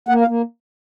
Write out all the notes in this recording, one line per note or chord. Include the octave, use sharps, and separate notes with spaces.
A#3 F#5
F5
A#3